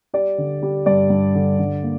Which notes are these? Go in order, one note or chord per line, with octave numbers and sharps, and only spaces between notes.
G3 D5
D3
G3
G2 D5
G2
D3
D3
A#3